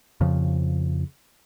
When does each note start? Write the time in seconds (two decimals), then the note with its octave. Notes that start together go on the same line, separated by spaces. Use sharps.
0.21 F2 C#3 F3